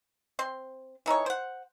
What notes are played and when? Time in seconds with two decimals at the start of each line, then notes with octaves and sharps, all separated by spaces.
0.39 C4 C6
1.06 E3 D#4 A4 C#5
1.26 C5 F#5